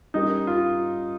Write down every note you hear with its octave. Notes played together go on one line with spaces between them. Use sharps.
G3 C#4 D#4 G4 A#4
F4